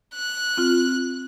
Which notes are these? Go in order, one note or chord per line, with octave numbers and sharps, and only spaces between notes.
F#6
C4 F4